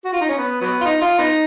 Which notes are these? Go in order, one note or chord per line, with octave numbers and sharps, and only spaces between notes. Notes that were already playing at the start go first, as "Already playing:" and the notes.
F#4
F4
D#4
C#4
B3
F#3 B3
F4
D#4
F4
B3 D#4